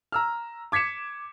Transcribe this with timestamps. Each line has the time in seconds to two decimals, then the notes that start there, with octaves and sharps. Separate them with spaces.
0.12 A#5 E6 F6
0.72 D6 G#6 B6 C#7 E7